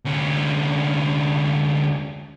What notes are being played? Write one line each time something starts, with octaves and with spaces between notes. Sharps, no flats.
D2 C#4